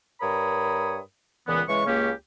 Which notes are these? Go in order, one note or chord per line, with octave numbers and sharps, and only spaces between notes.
G2 A#4 C#5 B5 D#6
C#2 A#2 E3 B3
C#3 E3 G#3 C#6
C#2 C#3 A#3 C#4 G4